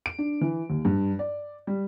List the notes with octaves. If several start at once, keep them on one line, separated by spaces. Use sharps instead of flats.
D7
D4
E3
D#2
G2
D5
G3